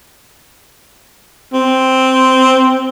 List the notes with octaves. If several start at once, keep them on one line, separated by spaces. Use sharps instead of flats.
C4